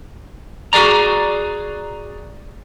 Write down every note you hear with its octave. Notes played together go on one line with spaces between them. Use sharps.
F#4 G#4 D5 A#5